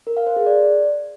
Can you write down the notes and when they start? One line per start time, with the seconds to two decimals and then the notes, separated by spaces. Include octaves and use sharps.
0.07 A#4
0.17 F5
0.27 C5
0.36 G#4
0.46 D5